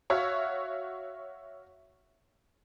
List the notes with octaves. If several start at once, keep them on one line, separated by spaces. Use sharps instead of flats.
F#4 C#5 E5 F5